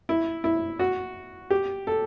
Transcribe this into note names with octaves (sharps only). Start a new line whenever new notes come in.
E4
E4
F#4
G4
A4